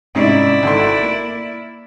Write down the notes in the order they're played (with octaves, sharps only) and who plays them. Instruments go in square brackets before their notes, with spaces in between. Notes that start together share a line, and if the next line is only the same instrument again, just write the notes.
[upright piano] G#2 C3 C#4 [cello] E4 D5
[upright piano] G#1 A4 C6
A#3